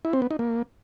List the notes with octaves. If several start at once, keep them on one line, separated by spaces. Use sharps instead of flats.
E4
C4
B3
D#4
A#3